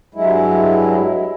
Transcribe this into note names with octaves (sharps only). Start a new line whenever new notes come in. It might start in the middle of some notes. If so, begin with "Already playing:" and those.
G2 F#3 G#3 E4